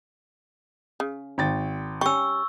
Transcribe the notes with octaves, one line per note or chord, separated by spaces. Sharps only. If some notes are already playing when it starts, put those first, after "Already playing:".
C#3
G#1 G5 A6
G3 C#4 C#6 E6